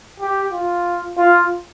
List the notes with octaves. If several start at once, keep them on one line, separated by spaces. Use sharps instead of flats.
G4
F4
F4